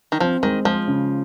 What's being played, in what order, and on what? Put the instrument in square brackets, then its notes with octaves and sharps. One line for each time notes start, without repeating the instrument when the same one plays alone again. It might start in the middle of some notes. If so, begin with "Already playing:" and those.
[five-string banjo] D#3
[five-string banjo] F3 [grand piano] C4
[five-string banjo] D#3 [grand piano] G#3
[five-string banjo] F3 [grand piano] G#3
[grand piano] C#3